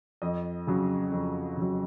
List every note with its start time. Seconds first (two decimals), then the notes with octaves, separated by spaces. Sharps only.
0.22 F2 D#5
0.67 C#3 F#3
1.11 F2
1.57 C#3 F#3